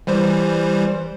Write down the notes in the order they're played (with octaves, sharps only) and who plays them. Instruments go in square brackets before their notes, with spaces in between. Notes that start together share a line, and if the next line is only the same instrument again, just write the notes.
[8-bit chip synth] E3 G3 C5